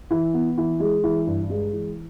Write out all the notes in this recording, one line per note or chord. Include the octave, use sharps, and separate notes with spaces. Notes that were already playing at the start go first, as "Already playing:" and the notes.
E3
B3
E3
G#3
E3
G2
G#3
E3